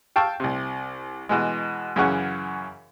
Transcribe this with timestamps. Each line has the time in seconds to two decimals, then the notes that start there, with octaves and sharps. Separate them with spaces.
0.16 F5 G5 A5 C#6 E6
0.40 C2 C3
1.29 B2 E3 G#3
1.96 F#2 C#3 E3 C#4 F#5 C#6